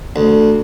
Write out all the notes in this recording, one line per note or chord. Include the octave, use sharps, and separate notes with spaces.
D2